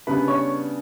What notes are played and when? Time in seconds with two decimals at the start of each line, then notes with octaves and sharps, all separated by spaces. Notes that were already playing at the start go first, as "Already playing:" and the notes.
0.07 C#3 G3 B3 D4 B4 B5
0.28 C#5 C#6